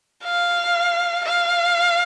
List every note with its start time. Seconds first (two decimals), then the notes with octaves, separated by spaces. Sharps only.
0.24 F5
1.25 F5